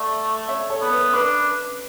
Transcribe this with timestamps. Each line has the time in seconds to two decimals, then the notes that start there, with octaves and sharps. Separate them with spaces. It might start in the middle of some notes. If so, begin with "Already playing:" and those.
Already playing: A3 D5 F#5
0.49 C#5 E5
0.70 A4 C#5
0.81 B3
0.92 B4
1.14 D4 B4